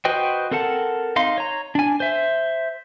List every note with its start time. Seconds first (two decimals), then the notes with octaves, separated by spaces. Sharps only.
0.05 F#4 B4 C5 D#5 G5
0.51 C4 A4 A#4 F#5 A5
1.16 D#4 F5 C6
1.38 C#5 A#5
1.75 D4 G#5
2.00 C5 E5